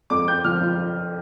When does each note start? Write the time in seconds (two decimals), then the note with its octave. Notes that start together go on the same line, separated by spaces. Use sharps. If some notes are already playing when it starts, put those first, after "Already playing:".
0.10 F2 D6
0.28 C4 G6
0.44 F3 F6
0.62 F3